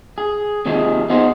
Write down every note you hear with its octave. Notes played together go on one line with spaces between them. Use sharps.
G#4
D#2 C3 F3 G#3 G#4
B3 D#4 F#4 G#4 B4 C5